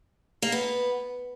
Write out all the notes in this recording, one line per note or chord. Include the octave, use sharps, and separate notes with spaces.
A#3
B3